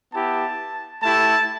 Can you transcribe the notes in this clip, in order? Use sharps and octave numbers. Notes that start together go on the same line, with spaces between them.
B3 E4 G4 A5
A3 E4 G4 A5